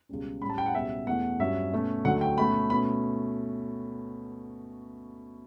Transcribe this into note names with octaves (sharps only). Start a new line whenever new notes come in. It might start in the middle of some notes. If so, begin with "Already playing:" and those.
C#2 B2 G3 C#4
A2 G3 C#4 B5
A5
G5
F#5
C#2 B2 G3 C#4 E5
E2 B2 A3 F#5
G2 F#3 C#4 E5
B2 A3 C#4
D2 D3 F#3 A3 F#5
G5
B2 A3 C#4 B5
B2 A3 C#4 B5